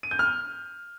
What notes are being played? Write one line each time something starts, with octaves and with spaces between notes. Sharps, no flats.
D#7
G6
F6